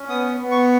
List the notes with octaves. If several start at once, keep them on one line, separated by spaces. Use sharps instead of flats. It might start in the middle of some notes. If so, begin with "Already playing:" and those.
Already playing: C#4
B3 D#6
B3
C#6